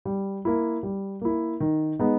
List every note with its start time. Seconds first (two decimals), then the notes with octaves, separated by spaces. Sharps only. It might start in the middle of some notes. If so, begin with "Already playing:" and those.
0.05 G3
0.45 A#3 E4
0.83 G3
1.21 A#3 E4
1.60 D#3
1.99 G#3 B3 D#4